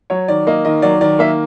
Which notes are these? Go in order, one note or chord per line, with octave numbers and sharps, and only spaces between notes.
F#3 C#5
D#3 D5
A#3 D#5
D#3 D#5
F#3 D5
D#3 D5
A#3 E5